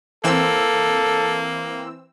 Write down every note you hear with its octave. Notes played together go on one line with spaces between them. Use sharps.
E3 A#3 C4 A4 E6